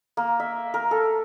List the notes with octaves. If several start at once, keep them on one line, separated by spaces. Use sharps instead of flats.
A#3
E5
A#4
A4